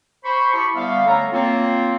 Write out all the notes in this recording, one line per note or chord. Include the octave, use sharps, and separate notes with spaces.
C5 B5 C#6
E4 G4 A5 B5 C#6
D3 G3 B3 E5 F5
A3 C#4 A4 C#5 A#5
A#3 C4 F4 C#5